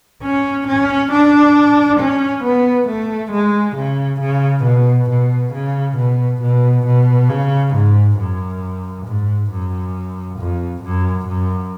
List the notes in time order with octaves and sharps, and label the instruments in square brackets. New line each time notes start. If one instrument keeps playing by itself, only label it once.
[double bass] C#4
C#4
D4
C#4
B3
A3
G#3
C#3
C#3
B2
B2
C#3
B2
B2
B2
C#3
G#2
F#2
G#2
F#2
F2
F#2
F#2